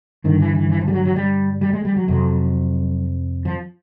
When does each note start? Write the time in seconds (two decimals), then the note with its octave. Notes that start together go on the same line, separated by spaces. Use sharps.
0.24 G2 D3 D#3
0.40 E3
0.55 E3
0.70 E3
0.81 F3
0.88 G3
0.93 F#3
1.05 F#3
1.16 G3
1.61 G3
1.73 G#3
1.85 G3
1.96 F#3
2.08 F2 C3 F#3
3.45 F3